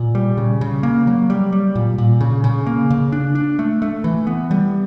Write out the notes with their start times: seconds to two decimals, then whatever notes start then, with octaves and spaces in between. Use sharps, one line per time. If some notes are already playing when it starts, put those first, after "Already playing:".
Already playing: A#2
0.15 G3
0.37 C#3
0.61 C#3
0.83 A#3
1.07 F#3
1.30 G3
1.53 G3
1.75 A#2
1.98 A#2
2.21 C#3
2.44 C#3
2.67 A#3
2.90 C#3
3.12 D4
3.35 D4
3.59 A3
3.82 A3
4.04 E3
4.27 B3
4.51 G3